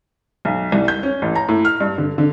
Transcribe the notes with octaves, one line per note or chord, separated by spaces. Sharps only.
B1
C2
G6
C#4
A1
A#5
A2
F6
G2
D3
D3